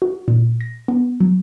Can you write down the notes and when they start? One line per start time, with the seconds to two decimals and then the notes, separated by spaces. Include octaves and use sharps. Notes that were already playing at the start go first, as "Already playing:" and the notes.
0.02 F#4
0.28 A#2
0.61 A#6
0.88 B3
1.20 F#3